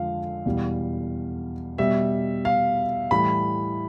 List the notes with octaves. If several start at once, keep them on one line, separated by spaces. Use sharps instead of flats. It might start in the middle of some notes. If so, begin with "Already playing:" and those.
Already playing: F2 D3 F3 G#3 F5
E2 B2 G3
B2 G3 E5
F5
A2 E3 G3 B5